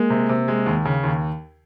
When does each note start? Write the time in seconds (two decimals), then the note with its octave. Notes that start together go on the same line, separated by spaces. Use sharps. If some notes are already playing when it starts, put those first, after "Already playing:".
Already playing: G#3 A#3
0.10 C3
0.29 C3
0.48 G#3
0.66 D#2
0.85 C#3
1.04 D#2